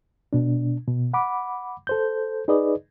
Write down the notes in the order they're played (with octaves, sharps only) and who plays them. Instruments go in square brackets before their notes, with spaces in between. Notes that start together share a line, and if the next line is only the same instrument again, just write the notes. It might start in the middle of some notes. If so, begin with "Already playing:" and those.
[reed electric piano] B2 D4
B2
F#5 B5 D6
A4 C5 G6
D#4 G#4 B4 D5 D#5